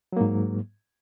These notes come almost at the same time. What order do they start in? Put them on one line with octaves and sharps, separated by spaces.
F#3 A#3 G#2